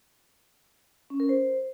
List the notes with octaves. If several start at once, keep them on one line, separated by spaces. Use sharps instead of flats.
C#4
A#4
C5